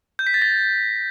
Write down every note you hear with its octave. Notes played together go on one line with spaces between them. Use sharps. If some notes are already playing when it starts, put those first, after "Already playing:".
G6
B6
A6
A#6